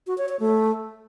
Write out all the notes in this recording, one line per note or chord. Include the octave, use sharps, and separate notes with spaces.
F#4
C#5
C#5
A3